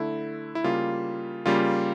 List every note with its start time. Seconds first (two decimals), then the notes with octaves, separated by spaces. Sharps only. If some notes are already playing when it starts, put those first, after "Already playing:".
Already playing: D3 A3 E4
0.55 E4
0.64 C#3 G3 A#3 F4
1.46 C#3 G3 A#3 F4